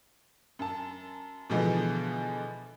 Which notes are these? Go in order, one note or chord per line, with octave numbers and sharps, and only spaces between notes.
F#2 A5
B2 D3 E3 F3 G#3 B3